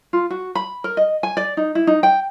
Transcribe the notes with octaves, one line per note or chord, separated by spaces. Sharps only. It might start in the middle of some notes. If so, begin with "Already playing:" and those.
F4
F#4
B5
A#4
D#5
G#5
D5
D#4
E4
D#4
G5